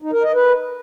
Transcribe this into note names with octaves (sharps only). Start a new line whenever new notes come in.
D#4
A#4
D#5
B4